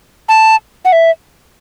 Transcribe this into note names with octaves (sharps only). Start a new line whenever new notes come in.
A5
F#5
E5